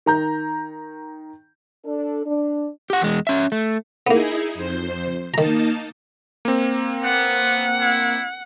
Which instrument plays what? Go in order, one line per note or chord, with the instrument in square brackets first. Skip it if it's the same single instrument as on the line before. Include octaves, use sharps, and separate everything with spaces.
[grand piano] D#3 A#5 G6
[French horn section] D4 A4
D4
[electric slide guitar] G4 F#5
E2 G#3
C#4 E5
A3
[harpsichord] A#3 B3 [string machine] D#4 E4 G#4
[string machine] F2 C5
[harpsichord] D#3 A#5 [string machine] A#3 D#4 A5
[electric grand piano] A#3 C4
[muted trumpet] B3 [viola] F#5
[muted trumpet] E4